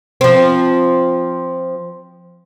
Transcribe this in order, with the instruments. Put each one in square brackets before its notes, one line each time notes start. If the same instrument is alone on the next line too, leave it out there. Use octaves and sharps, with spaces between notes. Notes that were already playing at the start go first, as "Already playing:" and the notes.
[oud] F3 C4